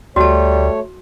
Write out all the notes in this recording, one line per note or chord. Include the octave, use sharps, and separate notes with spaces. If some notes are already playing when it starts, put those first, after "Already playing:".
D2 G3 A3 F#4 C#5 A5